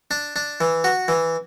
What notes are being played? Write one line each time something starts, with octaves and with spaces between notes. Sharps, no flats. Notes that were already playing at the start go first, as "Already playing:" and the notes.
D4
D4
E3
F#4
E3